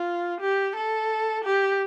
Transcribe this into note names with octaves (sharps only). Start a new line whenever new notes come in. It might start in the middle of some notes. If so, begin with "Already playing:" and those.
Already playing: F4
G4
A4
G4